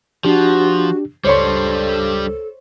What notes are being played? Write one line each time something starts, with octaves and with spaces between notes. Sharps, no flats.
F3 D4 F#4 G4
C#2 G3 D4 A4 C5 C#5 C6